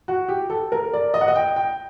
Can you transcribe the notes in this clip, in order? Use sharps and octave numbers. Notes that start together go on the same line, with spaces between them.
F#4
G4
A4
A#4
D5
D#5
F#5
D#5
G5
G5